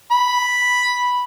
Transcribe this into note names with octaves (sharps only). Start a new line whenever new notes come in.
B5